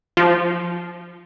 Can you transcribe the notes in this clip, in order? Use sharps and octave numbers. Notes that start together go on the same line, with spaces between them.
F3